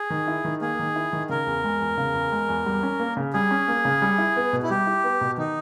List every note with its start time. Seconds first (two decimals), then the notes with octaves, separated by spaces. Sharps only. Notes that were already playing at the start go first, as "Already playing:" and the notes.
Already playing: G#4
0.10 D#3
0.28 E4
0.45 D#3
0.61 A#3 G#4
0.79 D#3
0.96 E4
1.13 D#3
1.29 C#3 A#4
1.46 E2
1.64 G#3
1.81 E2
1.98 C#3
2.14 E2
2.32 G#3
2.48 E2
2.66 G3
2.83 C#4
3.00 A#3
3.17 C#3
3.33 G3 G#4
3.51 C#4
3.68 A#3
3.85 C#3
4.02 G3
4.18 E4
4.36 B3
4.53 B2
4.63 E4
4.70 G3 G4
4.87 E4
5.04 B3
5.21 B2
5.38 D#3 D#4